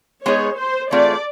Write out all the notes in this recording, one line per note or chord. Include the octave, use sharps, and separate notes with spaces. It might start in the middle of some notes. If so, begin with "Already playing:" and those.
G#3 B3 D#4 G#4 C#5
C5
E3 A3 C4 F4 G#4 D5